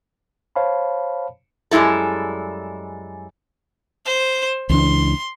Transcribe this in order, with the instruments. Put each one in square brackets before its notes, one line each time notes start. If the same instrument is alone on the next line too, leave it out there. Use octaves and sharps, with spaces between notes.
[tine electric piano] C5 C#5 F5 A5 B5
[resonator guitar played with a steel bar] F#2 G3 G#3 E4 A4
[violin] C5
[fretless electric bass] C#2 E3 D4 [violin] C6